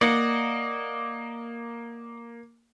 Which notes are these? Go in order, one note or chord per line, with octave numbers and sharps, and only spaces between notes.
A#3 D5 D#5 F#5